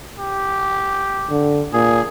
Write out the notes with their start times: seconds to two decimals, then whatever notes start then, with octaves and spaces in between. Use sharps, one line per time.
0.19 G4
1.30 D3
1.73 A#2 G#4